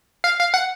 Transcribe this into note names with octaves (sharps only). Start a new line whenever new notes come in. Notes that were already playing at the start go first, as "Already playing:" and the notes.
F5
F5
F#5